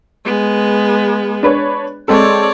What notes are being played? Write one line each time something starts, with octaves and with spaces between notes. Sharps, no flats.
G#3 B3
D4 B4 C#5
G#3 C4 A4 C#5 D5